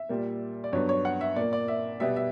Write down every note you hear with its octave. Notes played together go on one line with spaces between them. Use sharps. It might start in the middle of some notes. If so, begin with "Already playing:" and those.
Already playing: E5
A#2 G3 A#3
D5
G2 F#3 B3 C#5
C#5
F#5
E5
A#2 A#3 D5
D5
E5
B2 G3 B3 E5
E5